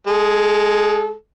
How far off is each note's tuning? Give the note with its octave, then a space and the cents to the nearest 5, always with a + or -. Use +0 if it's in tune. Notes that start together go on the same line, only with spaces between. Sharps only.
G#3 +0 A4 -30